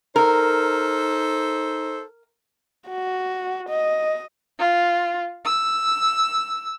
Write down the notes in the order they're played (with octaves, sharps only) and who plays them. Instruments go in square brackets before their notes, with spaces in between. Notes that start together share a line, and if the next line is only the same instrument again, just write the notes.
[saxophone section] D#4 A4 C5 [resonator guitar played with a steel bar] A#4
[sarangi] F#4
D#5
[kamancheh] F4
E6